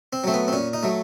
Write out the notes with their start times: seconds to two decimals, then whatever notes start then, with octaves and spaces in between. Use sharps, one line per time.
0.13 C4
0.24 F#3 A3 C4
0.34 B3
0.48 C4
0.53 A#2 C#4
0.73 D#4
0.83 F#3 A3